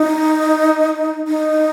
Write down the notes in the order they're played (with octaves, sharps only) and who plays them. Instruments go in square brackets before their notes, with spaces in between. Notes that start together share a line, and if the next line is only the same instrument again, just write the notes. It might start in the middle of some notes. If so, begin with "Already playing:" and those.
Already playing: [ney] D#4
D#4